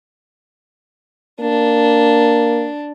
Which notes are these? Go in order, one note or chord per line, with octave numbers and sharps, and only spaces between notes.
A#3 D4